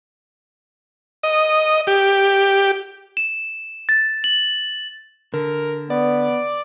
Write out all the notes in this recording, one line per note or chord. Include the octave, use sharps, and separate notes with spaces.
D#5
G4
E7
A6
F#7
D3 A#4
B3 D5